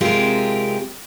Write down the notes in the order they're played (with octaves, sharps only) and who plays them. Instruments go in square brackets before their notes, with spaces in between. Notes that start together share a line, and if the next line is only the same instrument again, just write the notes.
[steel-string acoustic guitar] C3 G#3 C4 F4 G4 A#4